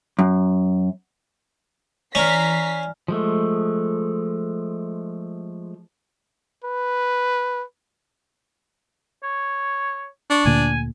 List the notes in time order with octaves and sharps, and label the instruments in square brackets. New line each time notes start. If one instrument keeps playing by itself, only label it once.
[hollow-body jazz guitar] F#2
[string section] E3 B6 C7 [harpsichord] C#4 [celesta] D5 G#5 F6 [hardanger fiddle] A#5
[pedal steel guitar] F3 G#3 A3
[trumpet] B4
[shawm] C#5
[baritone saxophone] D4 [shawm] C#6
[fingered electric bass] D2 A#2 D3 [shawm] G#5